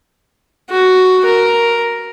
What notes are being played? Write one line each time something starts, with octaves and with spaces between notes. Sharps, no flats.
F#4
A#4